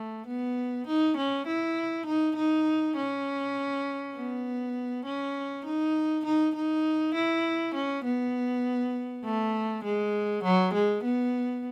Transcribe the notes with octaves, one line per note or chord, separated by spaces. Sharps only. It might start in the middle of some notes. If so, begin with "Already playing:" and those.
Already playing: A3
B3
D#4
C#4
E4
D#4
D#4
C#4
B3
C#4
D#4
D#4
D#4
E4
C#4
B3
A3
G#3
F#3
G#3
B3